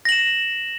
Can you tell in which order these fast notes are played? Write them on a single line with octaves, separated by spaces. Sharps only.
A#6 F#7 E7